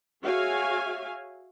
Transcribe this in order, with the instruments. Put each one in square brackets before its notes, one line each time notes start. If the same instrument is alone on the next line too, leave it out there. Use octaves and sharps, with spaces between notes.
[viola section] F#4 G#4 C#5 E5 F5 G#5